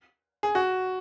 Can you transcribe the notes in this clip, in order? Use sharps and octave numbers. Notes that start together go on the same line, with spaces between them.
G#4
F#4